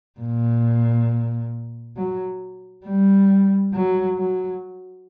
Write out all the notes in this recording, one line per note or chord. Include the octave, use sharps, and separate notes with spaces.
A#2
F#3
G3
F#3
F#3